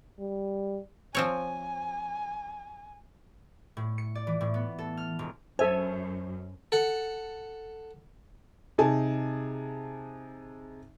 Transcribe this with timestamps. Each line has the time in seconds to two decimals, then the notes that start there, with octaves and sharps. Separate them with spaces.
0.19 G3
1.15 F3 C4 C#5 G#5
3.77 A2
3.98 C#7
4.15 D5
4.27 E3
4.41 A2
4.54 B3
4.79 A4
4.97 F6
5.19 E1
5.59 F#2 A4 C5 E5 G#5
6.72 A4 F#5
8.78 C3 D#4 G#4 G#5 A5